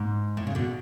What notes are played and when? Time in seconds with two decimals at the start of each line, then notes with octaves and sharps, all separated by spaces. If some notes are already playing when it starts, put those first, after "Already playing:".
Already playing: G#2
0.37 A2
0.47 C#3
0.55 B2 D3